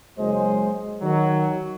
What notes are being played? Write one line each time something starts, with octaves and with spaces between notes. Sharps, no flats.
F#1 F#3 G#3 C5 D#5
D#3 F#3